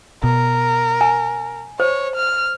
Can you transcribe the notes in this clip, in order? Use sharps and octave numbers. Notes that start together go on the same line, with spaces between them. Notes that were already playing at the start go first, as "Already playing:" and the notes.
B2 A#4
G#5
C5 C#5
F6